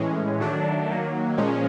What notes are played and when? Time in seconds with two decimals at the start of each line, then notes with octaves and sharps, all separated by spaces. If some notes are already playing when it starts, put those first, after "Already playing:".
Already playing: A2 E3 G#3 C#4
0.40 D#3 F#3 A3 D4
0.89 D#3 F#3 A#3
1.37 A#2 F3 G#3 C#4